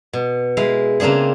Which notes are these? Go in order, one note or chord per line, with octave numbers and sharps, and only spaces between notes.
B2
G#3 E4 F5
C#3 A#3 C4 D4 G#4